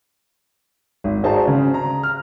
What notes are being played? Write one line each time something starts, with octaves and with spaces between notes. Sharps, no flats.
G#1
F#4 G#4 C5 D5 A5 A#5
C#3
A#5
F6